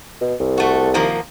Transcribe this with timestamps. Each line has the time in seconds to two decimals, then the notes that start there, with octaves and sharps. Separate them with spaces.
0.21 B2
0.40 C2
0.58 A3 F#4
0.94 D#3 F3 A#3